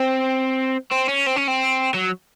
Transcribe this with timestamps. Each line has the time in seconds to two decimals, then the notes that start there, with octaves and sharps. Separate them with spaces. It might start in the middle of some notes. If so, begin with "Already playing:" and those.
Already playing: C4
0.91 C4
1.08 C#4
1.26 C4
1.36 C#4
1.47 C4
1.94 F#3